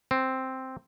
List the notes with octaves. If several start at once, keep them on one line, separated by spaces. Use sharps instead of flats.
C4